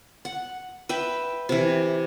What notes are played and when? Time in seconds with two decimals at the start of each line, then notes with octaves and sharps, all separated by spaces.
0.25 F#5
0.89 B4 E5 G5
1.49 C3 E3